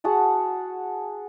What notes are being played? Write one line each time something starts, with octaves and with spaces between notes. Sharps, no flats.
F#4 G#4 F#5 A5